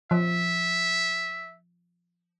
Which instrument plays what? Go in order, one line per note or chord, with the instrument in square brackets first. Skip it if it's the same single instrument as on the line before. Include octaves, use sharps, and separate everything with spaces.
[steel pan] F3 [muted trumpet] E5